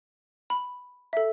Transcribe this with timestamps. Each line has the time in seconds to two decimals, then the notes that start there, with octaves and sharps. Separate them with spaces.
0.50 B5
1.13 A4 E5